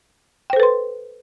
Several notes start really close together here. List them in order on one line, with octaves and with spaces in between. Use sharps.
G5 C5 A4 B4 C6